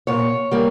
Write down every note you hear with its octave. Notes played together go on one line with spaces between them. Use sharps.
A#2 C#5
G3 A#3